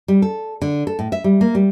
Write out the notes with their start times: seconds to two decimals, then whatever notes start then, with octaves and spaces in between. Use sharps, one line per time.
0.08 G3
0.22 A4
0.62 D3
0.87 A4
0.99 A2
1.12 E5
1.24 G3
1.41 A#3
1.55 G3